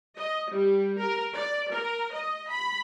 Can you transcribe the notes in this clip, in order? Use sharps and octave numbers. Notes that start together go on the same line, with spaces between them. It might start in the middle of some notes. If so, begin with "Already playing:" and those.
D#5
G3
A#4
D5
A#4
D#5
B5